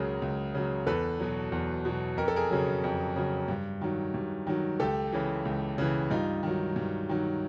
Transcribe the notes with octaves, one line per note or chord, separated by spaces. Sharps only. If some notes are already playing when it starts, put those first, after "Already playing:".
Already playing: C#2 C#3 F#3 G#4 A#4
C#2
C#3 F#3
E2 A4 B4
B2 F#3
E2
B2 F#3
F2 A#4
A4
G#4 A#4
C#3 F#3
F2
C#3 F#3
G2
D#3 F#3
G2
D#3 F#3
C#2 G4 A4
C#3 E3
C#2
C#3 E3
G2 D#4 F4
D#3 F#3
G2
D#3 F#3